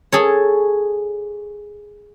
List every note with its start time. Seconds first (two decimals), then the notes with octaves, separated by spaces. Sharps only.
0.12 G#4 A4 C#5